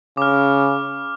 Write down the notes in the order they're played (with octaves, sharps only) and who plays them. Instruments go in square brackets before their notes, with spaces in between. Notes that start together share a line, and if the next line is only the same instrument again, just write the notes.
[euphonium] C#3 [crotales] D6 F6